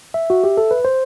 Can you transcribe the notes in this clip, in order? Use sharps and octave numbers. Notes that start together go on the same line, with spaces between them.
E5
F#4
G4
A4
B4
C5